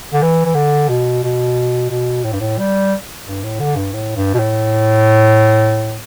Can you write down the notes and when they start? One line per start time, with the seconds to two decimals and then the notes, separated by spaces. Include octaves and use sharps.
0.13 D3
0.22 E3
0.45 E3
0.55 D3
0.89 B2
1.23 B2
1.90 B2
2.24 A2
2.33 G2
2.40 A2
2.58 G3
3.26 G2
3.43 A2
3.60 D3
3.76 G2
3.93 A2
4.16 G2
4.34 B2
4.39 A2